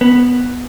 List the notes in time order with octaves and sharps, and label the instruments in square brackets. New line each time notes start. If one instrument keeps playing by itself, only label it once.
[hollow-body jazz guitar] B3